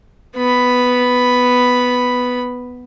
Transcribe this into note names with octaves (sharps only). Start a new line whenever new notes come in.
B3 B5